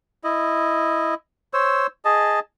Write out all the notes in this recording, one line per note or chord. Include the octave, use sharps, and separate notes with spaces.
E4 D#5
C5 C#5 E6
G#4 D#5 A5